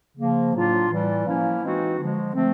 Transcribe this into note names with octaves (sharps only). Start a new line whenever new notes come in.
C#3 F3 A#3
A2 F#3 A#3 D4 F4
A2 E3 G3
F3 A#3 C#4 E4
E3 G#3 C4 D#4 F#4
D3 F3 G#3
F3 A3 C4